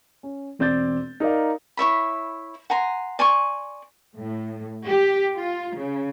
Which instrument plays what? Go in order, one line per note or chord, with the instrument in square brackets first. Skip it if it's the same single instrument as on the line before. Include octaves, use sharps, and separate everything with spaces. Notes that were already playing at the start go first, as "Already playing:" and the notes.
[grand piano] C#4
E1 C4 D5 G6 A6
D#4 A#4 D5 F5
[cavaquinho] E4 C#5 E5 B5
F#5 G#5 A#5 C6
D5 G#5 C6 C#6
[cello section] A2
G4
F4
C#3